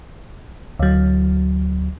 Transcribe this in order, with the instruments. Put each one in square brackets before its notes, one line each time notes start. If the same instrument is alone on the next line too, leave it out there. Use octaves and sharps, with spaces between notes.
[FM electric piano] D2 F#3